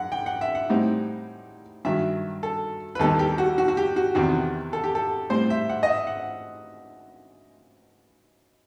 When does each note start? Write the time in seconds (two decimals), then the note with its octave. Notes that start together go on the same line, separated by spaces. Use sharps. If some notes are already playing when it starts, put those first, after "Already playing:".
Already playing: F#2 F#5
0.12 G5
0.26 F#5
0.41 E5
0.55 F#5
0.70 A2 G3 C4 D#4
1.85 G2 D#3 F#3 E5
2.43 A4
2.95 B4
2.99 D#2 D#3 G3 B3 D#4 A4
3.19 G4
3.38 F#4
3.58 F#4
3.68 F#4
3.77 G4
3.96 F#4
4.15 E2 C3 D#3 F#4
4.73 A4
4.84 G4
4.95 A4
5.30 A2 G3 C4 C5
5.50 E5
5.69 F#5
5.83 D#5
5.89 E5
6.07 F#5